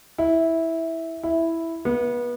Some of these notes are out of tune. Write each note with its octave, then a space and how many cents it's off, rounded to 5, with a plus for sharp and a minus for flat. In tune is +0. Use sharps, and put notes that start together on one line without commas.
E4 -10
E4 +0
B3 -30